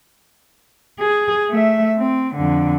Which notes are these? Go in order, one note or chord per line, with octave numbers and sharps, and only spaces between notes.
G#4
A3 E5
C4
F2 D3